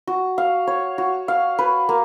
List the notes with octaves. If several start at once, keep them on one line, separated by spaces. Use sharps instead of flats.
F#4
F5
C#5
F#4
F5
B4
A#3